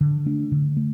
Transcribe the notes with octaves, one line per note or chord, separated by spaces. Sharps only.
D3
A3 D4
D3
A3